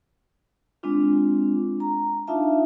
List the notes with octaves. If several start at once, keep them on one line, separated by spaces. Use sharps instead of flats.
G#3 C4 D4 F4
A#5
D4 D#4 F4 E5 F5 A5